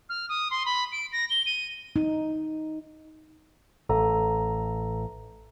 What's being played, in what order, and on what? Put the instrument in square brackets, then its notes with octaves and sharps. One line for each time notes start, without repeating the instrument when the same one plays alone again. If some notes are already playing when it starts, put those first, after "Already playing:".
[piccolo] F6
D#6
C6
B5
D7
A#6
G7
D#7
[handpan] D#4
[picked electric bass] A1 [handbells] A4 A#5